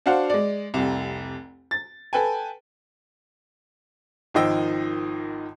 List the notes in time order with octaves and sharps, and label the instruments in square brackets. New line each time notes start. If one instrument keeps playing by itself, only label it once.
[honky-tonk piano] D4 F#4 C5 F5 F#5
G#3 D5
F1 C2
A6
A4 B4 G5 G#5
[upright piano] G#1 D#3 F3 D#5 G5 E6